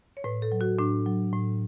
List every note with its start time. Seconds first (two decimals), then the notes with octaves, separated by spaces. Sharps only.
0.17 C#5
0.24 A2 B4
0.42 A4
0.52 F#3
0.61 F#4
0.79 A2 D4
1.06 F#3
1.33 A2